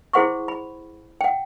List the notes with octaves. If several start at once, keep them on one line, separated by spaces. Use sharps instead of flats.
E4 G#4 C5 F#5 C6 C#6
B5
F#5 G5